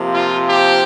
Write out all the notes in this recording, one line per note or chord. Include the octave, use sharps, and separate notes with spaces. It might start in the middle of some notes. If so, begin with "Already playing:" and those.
Already playing: C3 F3 A#3
F4
G4